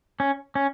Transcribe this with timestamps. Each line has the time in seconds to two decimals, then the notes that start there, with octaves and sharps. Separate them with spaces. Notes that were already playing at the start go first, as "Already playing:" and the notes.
0.20 C#4
0.55 C#4